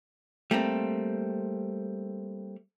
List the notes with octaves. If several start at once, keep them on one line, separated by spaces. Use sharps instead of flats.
G3 A3 A#3 C4